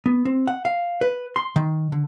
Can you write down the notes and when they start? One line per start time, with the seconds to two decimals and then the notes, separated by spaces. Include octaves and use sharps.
0.06 B3
0.25 C4
0.47 F#5
0.65 F5
1.01 B4
1.36 C6
1.56 D#3
1.92 D3